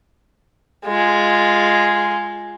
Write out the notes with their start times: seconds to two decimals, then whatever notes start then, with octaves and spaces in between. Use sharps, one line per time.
0.86 G#3 F4